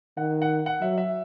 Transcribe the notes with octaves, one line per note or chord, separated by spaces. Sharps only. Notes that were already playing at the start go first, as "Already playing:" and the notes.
D#3 F#5
F#5
F#5
F#3 E5
E5